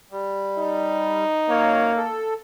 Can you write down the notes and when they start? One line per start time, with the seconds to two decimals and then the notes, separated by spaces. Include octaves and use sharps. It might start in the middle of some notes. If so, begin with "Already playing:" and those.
0.11 G3
0.58 D#4
1.49 F#2 A#3 C#5
1.97 A4